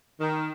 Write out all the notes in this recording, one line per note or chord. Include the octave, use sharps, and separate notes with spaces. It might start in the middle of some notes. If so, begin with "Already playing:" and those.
D#3